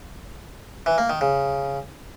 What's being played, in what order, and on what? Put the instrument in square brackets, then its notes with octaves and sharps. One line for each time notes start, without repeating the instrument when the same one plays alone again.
[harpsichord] E3
A#3
D#3
C#3